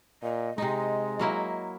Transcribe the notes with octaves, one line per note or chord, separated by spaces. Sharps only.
A#2 D#5
C3 G#3 D#4 D#5
F#3 A#3 E4